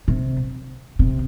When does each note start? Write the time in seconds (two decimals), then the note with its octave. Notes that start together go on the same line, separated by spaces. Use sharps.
0.08 C3
0.99 C3